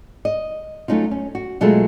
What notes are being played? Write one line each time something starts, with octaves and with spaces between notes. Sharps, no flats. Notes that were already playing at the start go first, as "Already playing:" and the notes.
D#5
F#3 A3 C#4 D#4 F4
C#4
F#4
B2 F#3 G#3 A3 F4 A4